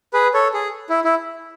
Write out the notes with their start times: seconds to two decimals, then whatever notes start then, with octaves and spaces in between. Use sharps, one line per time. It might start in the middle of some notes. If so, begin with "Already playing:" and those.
0.13 G#4 B4
0.34 A4 C#5
0.54 G#4
0.90 E4
1.04 E4